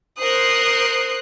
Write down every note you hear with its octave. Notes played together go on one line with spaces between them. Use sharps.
A#4 C5 D#6 F#6 C7